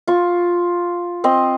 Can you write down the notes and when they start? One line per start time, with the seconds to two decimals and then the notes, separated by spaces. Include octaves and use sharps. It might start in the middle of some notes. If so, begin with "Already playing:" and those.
0.07 F4 C#6
1.24 C4 C5 D#5